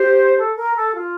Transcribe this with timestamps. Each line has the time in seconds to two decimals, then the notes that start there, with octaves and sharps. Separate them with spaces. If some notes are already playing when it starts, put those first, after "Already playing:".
Already playing: G4 C5
0.38 A4
0.57 A#4
0.76 A4
0.94 F4